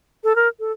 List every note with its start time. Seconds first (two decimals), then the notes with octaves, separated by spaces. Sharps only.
0.24 A4
0.36 A#4
0.60 A4